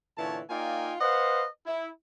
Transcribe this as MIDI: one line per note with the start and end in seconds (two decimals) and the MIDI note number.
0.18 0.41 46
0.18 0.41 50
0.18 0.41 52
0.18 0.41 61
0.18 0.41 73
0.18 0.41 81
0.50 0.94 58
0.50 0.94 63
0.50 0.94 65
0.50 0.94 74
0.50 0.94 79
0.50 0.94 80
1.00 1.44 71
1.00 1.44 72
1.00 1.44 75
1.00 1.44 77
1.00 1.44 78
1.66 1.88 64